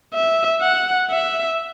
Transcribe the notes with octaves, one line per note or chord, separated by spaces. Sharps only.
E5
F#5
E5